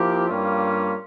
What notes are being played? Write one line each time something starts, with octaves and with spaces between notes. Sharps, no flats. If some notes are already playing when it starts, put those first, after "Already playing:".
Already playing: F3 A#3 E4 G4
G2 G3 A#3 C#4 F4